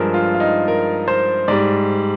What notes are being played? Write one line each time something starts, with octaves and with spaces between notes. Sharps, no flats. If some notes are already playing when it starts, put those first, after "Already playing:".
Already playing: G2 F3 G#3 A#4
F4
F4
D#4
A#4
C5
G#2 G3 D5